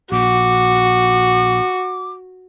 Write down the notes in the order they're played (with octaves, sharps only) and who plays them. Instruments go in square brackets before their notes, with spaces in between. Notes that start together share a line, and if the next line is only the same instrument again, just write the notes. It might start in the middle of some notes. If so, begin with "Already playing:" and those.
[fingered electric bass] A#1 [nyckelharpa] F#4 [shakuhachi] D6